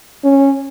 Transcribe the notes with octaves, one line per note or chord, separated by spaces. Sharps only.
C#4